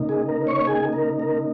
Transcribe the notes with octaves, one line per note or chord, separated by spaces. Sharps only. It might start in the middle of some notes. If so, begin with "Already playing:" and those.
Already playing: C#3 A#3 D#4
G#4
A#4
C#5 C#6
G#4 G#5
A#4
A#4